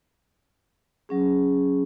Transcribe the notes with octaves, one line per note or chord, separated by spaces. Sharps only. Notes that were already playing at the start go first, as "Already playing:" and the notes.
F#3 C#4 G#4